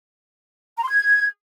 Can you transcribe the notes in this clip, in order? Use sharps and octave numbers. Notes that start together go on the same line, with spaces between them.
A#5
C6
G#6